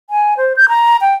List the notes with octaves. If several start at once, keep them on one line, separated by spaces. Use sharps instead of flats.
G#5
C5
G6
A#5
G5